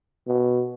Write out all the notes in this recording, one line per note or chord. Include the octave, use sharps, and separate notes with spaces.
B2